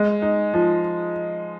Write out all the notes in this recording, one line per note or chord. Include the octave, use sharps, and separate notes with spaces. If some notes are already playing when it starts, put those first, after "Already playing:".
Already playing: G#3
D#4
F3